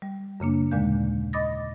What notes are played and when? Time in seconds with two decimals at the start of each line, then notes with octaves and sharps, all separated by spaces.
0.02 G3
0.40 F#2 C#3 A#3 D4
0.71 D#2 A#2 D3 G#3 F5 G6
1.33 D#5 B5 D6 D#6 A6 A#6